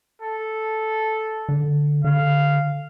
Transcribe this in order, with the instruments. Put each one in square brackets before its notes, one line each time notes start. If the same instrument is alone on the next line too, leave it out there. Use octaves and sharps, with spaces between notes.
[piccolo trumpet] A4
[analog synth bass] D3
[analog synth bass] D3 [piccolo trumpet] F5